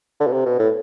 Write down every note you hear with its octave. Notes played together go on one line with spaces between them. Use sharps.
D3
B2
C3
B2
A2